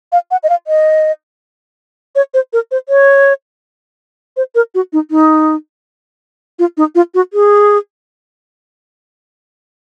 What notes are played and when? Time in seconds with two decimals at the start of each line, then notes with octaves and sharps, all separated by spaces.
0.12 F5
0.31 F#5
0.43 D#5
0.50 F5
0.67 D#5
2.15 C#5
2.34 C5
2.53 A#4
2.71 C5
2.89 C#5
4.37 C5
4.55 A#4
4.75 F#4
4.93 D#4
5.11 D#4
6.59 F4
6.77 D#4
6.95 F4
7.14 F#4
7.33 G#4